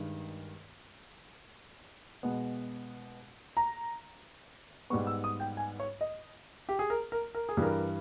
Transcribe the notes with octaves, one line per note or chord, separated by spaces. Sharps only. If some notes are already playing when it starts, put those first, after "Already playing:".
Already playing: G2 D#3 G#3
B2 G#3 B3
A#5
G#2 G3 B3 C#6
E6
D#6
G5
G#5
C#5
D#5
G4
G#4
A#4
A#4
A#4
G#4
G2 E3 G3
A#4